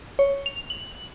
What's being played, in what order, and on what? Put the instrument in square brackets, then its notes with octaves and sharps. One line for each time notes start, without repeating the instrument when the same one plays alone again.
[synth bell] C#5
F7
F#7